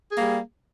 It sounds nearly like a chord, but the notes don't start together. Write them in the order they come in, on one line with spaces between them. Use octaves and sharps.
G#4 A#3 G3